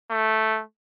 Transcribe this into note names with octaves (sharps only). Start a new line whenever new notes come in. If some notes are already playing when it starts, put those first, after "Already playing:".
A3